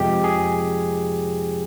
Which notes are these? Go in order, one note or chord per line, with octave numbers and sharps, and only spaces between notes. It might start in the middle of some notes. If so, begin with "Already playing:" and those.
Already playing: F2 C3 F3 G#3 G4
G#4